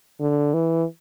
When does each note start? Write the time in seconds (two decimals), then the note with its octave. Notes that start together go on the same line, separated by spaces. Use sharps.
0.20 D3
0.53 E3